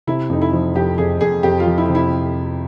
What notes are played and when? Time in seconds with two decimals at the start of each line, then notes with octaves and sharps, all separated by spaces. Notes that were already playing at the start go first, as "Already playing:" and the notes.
0.07 C3 E4
0.30 F2 D#4
0.42 E4
0.53 F3
0.75 F2 G4
0.98 F2 G#4
1.21 F2 G#4
1.43 F2 G4
1.60 F4
1.66 F3
1.78 E4
1.89 C3
1.95 E4